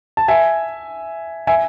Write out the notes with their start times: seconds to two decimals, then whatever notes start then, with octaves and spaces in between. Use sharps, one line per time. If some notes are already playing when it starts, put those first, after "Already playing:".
0.17 A5
0.28 E5 G#5
1.47 E5 G#5